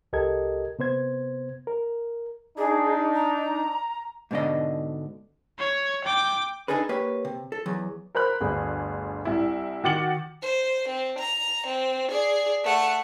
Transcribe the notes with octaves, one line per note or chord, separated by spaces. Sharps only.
C2 G4 A4 A#4 D#5 G#6
C3 B3 C5 G#6
A#4
D4 D#4 G#4
A#5
G#2 B2 D3 D5 D#5
C#5
G5 D6
D4 D#4 G#4 A4 B4
A#3 G4 B4 C#5
C3
A4
E2 F#3
A#4 C5 A#5 B5 F#6
G1 D2 G#4
C2 E4
D#3 F#4 D6 A6 C#7 F#7
C5
C4
A#5
C4
G#4 D5
A3 F#5